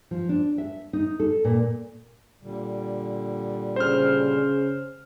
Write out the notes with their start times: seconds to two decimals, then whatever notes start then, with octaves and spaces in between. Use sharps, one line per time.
0.11 F3
0.29 D4
0.58 E5
0.93 D#4
1.20 A4
1.45 A#2
2.41 A#2 D3 G3
3.76 C#3 C5 F6